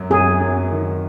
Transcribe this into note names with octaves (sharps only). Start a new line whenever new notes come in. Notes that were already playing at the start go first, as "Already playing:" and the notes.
Already playing: F#2 F#3
F#2 G#4
F#2
D#3